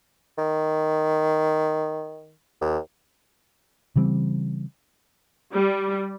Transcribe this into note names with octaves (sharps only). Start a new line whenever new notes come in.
D#3
D#2
C#3 E3 G3 C4
G3